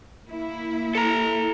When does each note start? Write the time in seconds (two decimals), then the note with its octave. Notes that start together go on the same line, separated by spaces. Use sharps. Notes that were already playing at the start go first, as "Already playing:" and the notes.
0.29 A#3 E4
0.95 A4 A#5